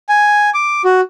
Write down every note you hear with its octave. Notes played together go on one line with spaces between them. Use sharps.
G#5
D6
F#4